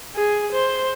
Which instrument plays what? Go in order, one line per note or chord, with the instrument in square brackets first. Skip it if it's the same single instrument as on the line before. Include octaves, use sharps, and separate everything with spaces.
[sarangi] G#4
C5